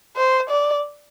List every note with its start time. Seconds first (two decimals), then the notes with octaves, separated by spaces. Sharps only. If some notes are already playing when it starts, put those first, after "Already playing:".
0.16 C5
0.50 D5